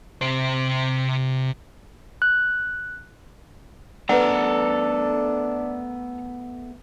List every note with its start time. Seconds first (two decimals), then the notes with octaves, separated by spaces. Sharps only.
0.22 C3 C5
2.22 F#6
4.09 A3 B3 D4 A4 B4 F#5 A#5